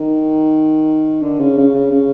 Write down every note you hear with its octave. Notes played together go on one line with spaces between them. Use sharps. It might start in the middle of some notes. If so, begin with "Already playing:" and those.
Already playing: D#3
D3
C#3
C#3
C#3
C#3